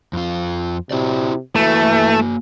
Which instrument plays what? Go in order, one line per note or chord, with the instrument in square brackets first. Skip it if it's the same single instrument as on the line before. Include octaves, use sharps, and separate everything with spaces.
[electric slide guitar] F2 F4
[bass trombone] C3 [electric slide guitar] E4 F#4 D5
[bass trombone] E3 [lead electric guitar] A3 [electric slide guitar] A#3 F#4